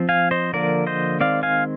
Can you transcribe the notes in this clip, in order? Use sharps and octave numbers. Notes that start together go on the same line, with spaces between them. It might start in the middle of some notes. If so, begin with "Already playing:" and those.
Already playing: F3 C4
F5 G#5
C5 D#5
D3 F3 A#3 A#4 D5
C5 D#5
D#3 G#3 C4 D5 F5
F5 G#5